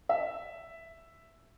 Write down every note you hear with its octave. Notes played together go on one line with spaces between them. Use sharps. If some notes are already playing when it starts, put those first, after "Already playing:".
E5